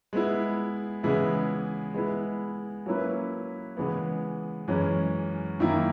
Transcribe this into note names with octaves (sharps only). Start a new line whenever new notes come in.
G#3 B3 E4
C#3 E3 G#3 B3 E4
G#3 B3 E4
F#3 A#3 C#4 E4 B4
C#3 E3 G#3 B3
F#2 E3 G#3 C#4
F#2 D#3 A#3 E4